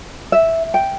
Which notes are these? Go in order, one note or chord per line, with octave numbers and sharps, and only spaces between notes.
E5
G5